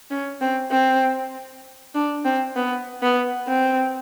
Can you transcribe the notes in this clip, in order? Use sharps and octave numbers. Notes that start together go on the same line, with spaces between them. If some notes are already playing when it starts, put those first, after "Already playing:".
C#4
C4
C4
D4
C4
B3
B3
C4